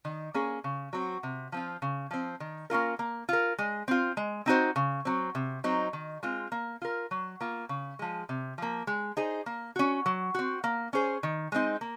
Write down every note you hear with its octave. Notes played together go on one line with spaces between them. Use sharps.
D#3
A#3 C#4 G#4
C#3
F#3 C4 F#4
C3
F3 C4 F4
C#3
F3 C4
D#3
A#3 C#4 F4 A#4
A#3
F4 A#4
G#3
C4 F4
G#3
C4 D#4 F#4 C5
C#3
F#3 C4
C3
F#3 C4 D#4
D#3
G#3 C4 F4
A#3
F4 A#4
F#3
A#3 F4
C#3
F3 G#3
C3
F3 A#3
G#3
D#4 G#4 C5
A#3
C#4 F#4
F#3
C4 F#4
A#3
C#4 G#4 C5
D#3
G#3 C4 D#4
A#3